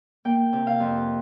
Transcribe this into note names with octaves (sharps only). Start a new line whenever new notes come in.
A#3 G5
C3
F5
F2